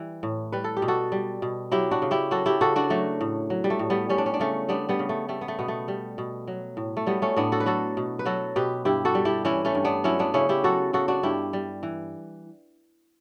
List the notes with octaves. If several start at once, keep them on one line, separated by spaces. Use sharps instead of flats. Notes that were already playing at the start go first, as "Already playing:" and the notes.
Already playing: E3 G3
A2
G3 B4
A4
G4
B2
F#4 A4
G3
B2
F#3 E4 G4
D4 F#4
C#3
E4 G4
F#3 F#4 A4
E4 G4
C#3 F#4 A4
D4 F#4
F#3 A3
A2
F#3
G3
A3
A2
G3 B3
G3 C#4
D4
C#4
D4
C#3 A3 C#4
G3 B3 D4
G3 B3
C#3
A3
G3 A3
B3
A3
B2 B3
A3
G3
B2
F#3
A2
A3
F#3 G3 B3
A3 C#4
A2 B3 D4
F#4 A4
B4
F#3 F#4 A4
B2
B4
F#3 F#4 A4
B2 G4 B4
G2 E4 G4
F#4 A4
G3
E4 G4
E3 C#4 E4
A3 C#4
G2
B3 D4
F#3 C#4 E4
B3 D4
C#3 C#4 E4
E4 G4
F#3 F#4 A4
C#3 F#4 A4
D4 F#4
G2 E4 G4
G3
E3